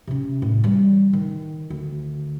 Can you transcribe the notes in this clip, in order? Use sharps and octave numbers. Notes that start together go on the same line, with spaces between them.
C3 C#4
A2
E3 G3
D#3
D2